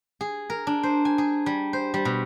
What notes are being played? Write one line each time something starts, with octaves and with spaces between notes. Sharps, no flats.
G#4
A#4
D4
C5
G#5
G#4
G3
C5
G3
B2